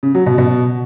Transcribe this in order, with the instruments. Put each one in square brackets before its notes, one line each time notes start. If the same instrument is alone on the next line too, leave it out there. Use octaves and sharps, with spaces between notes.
[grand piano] C#3
F#3
B2
B2